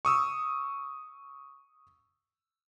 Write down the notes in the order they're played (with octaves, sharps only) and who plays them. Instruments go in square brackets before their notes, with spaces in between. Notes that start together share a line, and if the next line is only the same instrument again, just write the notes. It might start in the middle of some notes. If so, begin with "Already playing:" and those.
[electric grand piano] C#6 D#6 E6